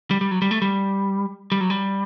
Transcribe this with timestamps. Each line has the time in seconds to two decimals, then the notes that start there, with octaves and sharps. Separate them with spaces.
0.11 G3
0.21 G3
0.31 F#3
0.42 G3
0.51 A3
0.62 G3
1.52 G3
1.61 F#3
1.70 G3